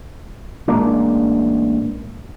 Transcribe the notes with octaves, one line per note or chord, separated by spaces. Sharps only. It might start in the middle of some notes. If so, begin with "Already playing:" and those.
A1 G#3 A#3 D4